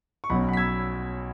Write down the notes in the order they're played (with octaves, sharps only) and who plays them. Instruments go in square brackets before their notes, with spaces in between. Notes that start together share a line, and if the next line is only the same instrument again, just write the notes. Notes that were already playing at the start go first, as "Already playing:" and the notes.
[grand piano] C#6
B1 B2 F#3 C#4 F#5 B5
F#5 B5
B6
E6 G#6